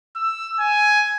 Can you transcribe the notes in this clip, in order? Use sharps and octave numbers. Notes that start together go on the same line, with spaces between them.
E6
G#5